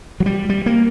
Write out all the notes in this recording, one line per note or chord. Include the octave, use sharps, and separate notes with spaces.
F#3
G3
G3
A#3